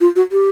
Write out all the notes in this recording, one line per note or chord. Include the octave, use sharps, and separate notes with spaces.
F4
F#4
G4